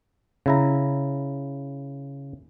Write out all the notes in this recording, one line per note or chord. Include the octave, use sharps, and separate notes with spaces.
C#3 E4 A#5